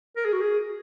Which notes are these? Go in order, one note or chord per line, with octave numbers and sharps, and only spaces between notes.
A#4
G#4
F#4
G#4